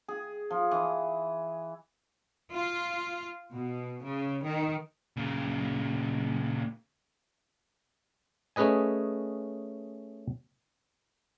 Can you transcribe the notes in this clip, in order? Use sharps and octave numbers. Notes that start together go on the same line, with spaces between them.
G#4
F3
E3
F4
B2
C#3
D#3
A#2 C#3
A3 C#4 G#4 B4 D#5 G#5